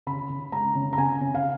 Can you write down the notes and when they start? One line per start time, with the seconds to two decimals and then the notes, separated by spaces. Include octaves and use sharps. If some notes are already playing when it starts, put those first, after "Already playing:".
0.07 C#3 B5
0.29 C#3
0.52 G#3 A#5
0.75 C#3
0.93 A#5
0.98 C#3 G#5
1.21 C#3
1.34 F5